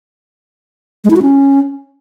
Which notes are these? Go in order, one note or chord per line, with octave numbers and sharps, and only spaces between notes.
G#3
E4
F#4
C#4